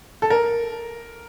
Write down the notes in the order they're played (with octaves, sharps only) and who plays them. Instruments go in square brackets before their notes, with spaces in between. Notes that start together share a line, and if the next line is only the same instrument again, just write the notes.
[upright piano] A4
A#4